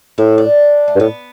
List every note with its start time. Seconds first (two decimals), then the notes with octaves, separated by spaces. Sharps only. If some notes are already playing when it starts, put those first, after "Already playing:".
0.18 A2 E4
0.38 D4
0.88 A3
0.95 G2
1.00 A2 B3